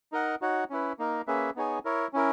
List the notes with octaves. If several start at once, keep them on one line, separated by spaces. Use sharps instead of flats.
D#4 A#4 D#5 F#5
D#4 F#4 C#5 F#5
C#4 E4 B4
A#3 D#4 A#4
A#3 C#4 G#4 B4 E5
B3 D#4 G#4 C#5 G#5
E4 A#4 C#5
C#4 E4 A#4